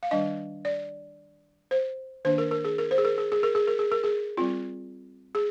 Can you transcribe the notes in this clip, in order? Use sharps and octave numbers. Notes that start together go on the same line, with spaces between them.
F5
D#3 G3 D4 D#5
D5
C5
D#3 A#3 D4 C5
A#4
A#4
G#4
A#4
C5
G#4
A#4
G#4
G#4
A#4
G#4
A#4
G#4
A#4
G#4
G3 C4 F4
G#4